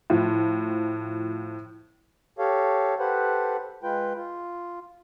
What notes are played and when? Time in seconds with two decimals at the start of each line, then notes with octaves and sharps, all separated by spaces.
0.10 A2 F3
2.39 G4 A4 C#5 F5
2.99 G4 A4 B4 C5 F#5
3.83 G#3 F4 B4 G5
4.16 F4